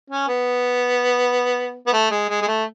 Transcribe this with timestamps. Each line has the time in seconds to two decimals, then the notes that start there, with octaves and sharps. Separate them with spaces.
0.10 C#4
0.28 B3
1.87 B3
1.93 A3
2.11 G#3
2.29 G#3
2.42 G#3
2.48 A3